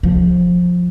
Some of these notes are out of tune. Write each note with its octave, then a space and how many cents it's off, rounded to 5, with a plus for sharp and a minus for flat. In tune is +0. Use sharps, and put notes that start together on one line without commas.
F3 +20